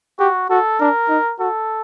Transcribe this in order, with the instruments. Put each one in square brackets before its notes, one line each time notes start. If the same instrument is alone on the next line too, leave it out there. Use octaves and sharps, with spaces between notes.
[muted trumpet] F#4 [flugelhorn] G4
[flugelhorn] F#4 [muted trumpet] A4
[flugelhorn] D4 [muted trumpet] A#4
[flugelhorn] D#4
[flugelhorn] F#4 [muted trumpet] A4